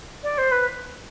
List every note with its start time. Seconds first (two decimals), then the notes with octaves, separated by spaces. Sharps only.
0.23 D5
0.38 C5
0.52 B4